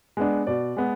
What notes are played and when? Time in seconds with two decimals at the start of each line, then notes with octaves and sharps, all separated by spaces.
0.17 G#3 B3 D4
0.47 B2 D5
0.77 G#3 B3